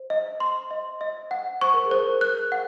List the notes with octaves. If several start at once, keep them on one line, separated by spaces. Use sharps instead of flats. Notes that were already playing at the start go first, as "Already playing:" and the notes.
Already playing: C5
D#5
C6
D#5
D#5
F#5
C5 C#6
A#4
G#4
C5
A#4
F#6
F#5